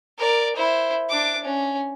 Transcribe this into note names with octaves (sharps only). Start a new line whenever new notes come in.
A#4 D5
E4 C5
D4 D6
C#4